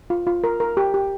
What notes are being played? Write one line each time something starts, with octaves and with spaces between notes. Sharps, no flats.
F4
F4
A#4
A#4
G4
G4